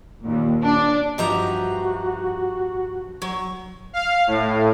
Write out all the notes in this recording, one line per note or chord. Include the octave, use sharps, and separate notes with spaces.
D#2 A#2
D4
G2 F3 D#4 F#4 G4 E5 A#5
F#3 C#5
F5
A2